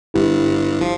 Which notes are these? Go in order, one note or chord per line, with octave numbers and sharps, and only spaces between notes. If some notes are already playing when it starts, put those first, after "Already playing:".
G1 G2 E4 G4
F3